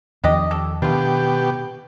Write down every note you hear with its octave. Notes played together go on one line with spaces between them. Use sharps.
E2 D#3 F3 D4 G4 D#5
G4 A4
B2 D#3 D4 F4 G4